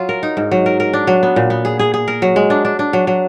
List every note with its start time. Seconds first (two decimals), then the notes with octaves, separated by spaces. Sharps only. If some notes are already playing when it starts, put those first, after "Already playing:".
Already playing: F#3 F4
0.09 A#4
0.23 D#4
0.37 G#2
0.51 F#3
0.66 A#4
0.80 A#4
0.93 D4
1.07 F#3
1.23 B3
1.36 A#2
1.50 B3
1.65 G#4
1.79 G#4
1.94 G#4
2.08 A#4
2.22 F#3
2.36 G#3
2.50 D4
2.65 D4
2.79 D4
2.93 F#3
3.07 F#3